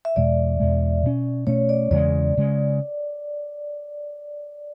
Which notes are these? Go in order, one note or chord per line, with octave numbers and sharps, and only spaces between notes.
E5
E2 B2 G#3 D5
E2 B2 G#3
B2 A3 C#4
B2 A3 C#4 C#5
D5
E2 C#3 G#3 D5
C#3 G#3